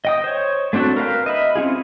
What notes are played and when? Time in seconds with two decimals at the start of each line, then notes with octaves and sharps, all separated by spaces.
0.05 D#5 G5 D#6
0.24 C5 C#5
0.73 A3 C4 D4 F#4 A4
0.97 A#4 B4 F5 G5
1.26 D#5 E5 B5
1.55 C4 C#4 F4 G#4